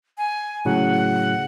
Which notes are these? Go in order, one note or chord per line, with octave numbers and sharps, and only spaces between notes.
G#5
A2 C#3 F#3 F#5